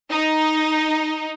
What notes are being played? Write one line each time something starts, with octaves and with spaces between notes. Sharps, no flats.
D#4